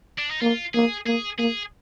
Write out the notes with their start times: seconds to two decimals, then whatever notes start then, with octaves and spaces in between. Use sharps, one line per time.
0.18 D4
0.31 D#4
0.42 A#3 F4
0.74 A#3 G#4
1.06 A#3 G#4
1.38 A#3 G#4